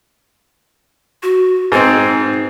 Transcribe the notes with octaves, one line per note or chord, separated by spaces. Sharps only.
F#4
G#2 C4 D#4